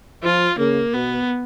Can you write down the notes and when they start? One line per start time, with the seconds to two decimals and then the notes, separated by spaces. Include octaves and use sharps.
0.24 F3 F4
0.58 C#3 A#3
0.94 B2 B3